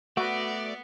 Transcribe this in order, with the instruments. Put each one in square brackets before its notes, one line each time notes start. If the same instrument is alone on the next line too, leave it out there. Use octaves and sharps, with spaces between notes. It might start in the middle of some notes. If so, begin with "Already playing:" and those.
[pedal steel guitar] A3 B4 [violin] B3 [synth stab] F#4 [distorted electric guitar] D5